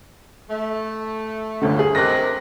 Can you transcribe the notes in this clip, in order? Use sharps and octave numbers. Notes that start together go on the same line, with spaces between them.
A3
G1 D2 D3
G#4
C3 D#3 F#6 A#6